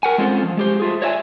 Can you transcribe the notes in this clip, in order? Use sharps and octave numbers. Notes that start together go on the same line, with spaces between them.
A#4 F#5 G#5
G#3 C4 C#4 F4 A4 C5
F3
G#3 G4 C5
A3 F4 G#4
C#5 D5 E5 G5 G#5